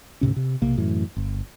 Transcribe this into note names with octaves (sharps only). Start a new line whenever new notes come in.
D2 G#2 C3 C#4
C3
B1 C3 A#3
F#2 A2 E3
G1